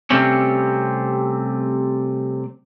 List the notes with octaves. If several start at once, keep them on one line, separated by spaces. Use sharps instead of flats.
C3 G3 A3 C4 C#4